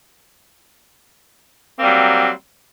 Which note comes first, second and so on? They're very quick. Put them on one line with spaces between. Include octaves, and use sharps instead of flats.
C4 A#3 G3 F#3